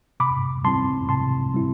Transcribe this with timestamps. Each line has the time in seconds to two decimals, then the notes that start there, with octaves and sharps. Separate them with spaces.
0.20 C3 B5 D6
0.64 G3 C4 E4 A5 C6
1.09 C3 A5 C6
1.54 G3 C4 E4